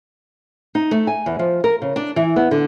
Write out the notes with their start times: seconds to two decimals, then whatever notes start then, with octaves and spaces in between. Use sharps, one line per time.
0.75 D#4
0.91 A3
1.07 G#5
1.26 E2
1.39 F3
1.64 A#4
1.82 C#3
1.96 D4
2.16 E3
2.36 B3
2.51 D3